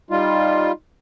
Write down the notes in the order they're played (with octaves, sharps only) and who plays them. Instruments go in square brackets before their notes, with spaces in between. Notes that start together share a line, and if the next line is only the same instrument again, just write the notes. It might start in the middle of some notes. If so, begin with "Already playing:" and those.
[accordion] G3 F4 [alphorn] D#4